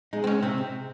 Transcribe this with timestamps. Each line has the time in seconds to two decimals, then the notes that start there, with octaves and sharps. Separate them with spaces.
0.13 G#3 D#4
0.24 C4
0.27 C#4 D#4
0.42 C3 C4
0.58 C3